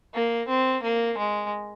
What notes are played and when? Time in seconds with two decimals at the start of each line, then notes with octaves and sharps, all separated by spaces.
0.14 A#3
0.48 C4
0.83 A#3
1.18 G#3